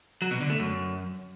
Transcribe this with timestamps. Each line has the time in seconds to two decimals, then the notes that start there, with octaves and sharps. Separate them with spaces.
0.22 F#3
0.31 B2
0.40 D3
0.50 A3
0.59 F#2